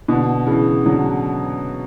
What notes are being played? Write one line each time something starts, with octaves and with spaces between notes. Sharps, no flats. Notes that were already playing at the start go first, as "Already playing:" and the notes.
B2 D3
C#3 E3
D3 F#3